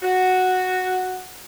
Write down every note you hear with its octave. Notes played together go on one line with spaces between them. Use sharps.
F#4